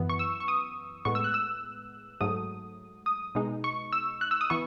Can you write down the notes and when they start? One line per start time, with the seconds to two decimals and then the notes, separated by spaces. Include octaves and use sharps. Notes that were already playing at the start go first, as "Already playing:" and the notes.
Already playing: F#2 E3 B3
0.10 C#6
0.19 E6
0.40 C#6
0.48 D#6
1.05 A2 G#3 B3 C#6
1.15 E6
1.24 F#6
1.34 E6
2.21 G#2 F#3 A3 D#6
3.06 D#6
3.35 B2 G#3 D#4
3.64 C#6
3.93 E6
4.21 F#6
4.31 E6
4.41 D#6
4.50 E3 B3 C#6